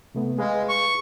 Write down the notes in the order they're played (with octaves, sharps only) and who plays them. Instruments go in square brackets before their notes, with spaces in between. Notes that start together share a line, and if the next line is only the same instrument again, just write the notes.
[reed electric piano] C3 A3 B3
[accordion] G#3 [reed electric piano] G#4 B4 F5
[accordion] C#6